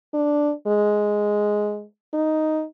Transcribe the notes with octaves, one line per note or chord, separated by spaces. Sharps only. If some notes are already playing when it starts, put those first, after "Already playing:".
D4
G#3
D#4